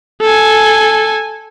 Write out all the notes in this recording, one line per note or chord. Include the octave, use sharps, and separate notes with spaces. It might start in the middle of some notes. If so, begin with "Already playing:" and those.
A4 G#5